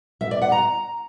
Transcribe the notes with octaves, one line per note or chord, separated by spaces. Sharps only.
E5
D5
F#5
A#5